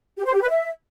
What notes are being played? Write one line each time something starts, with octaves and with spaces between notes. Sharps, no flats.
G4
C5
G4
B4
E5